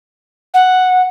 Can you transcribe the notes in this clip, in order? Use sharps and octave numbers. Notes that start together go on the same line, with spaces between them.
F#5